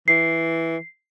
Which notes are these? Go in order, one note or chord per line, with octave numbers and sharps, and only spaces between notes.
E3 C7